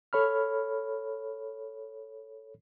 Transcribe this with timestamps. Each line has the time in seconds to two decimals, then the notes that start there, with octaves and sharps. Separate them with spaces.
0.13 A4 C#5 B5 F6